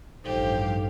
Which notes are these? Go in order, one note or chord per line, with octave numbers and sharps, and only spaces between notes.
A1 G2 F3 D#4 G4 A4 C5 F5